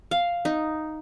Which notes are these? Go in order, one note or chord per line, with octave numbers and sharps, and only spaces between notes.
F5
D#4